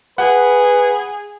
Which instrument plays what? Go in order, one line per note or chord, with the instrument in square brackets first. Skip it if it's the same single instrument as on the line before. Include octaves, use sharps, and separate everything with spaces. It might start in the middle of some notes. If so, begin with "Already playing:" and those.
[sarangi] G#4 [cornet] B4 [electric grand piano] F#5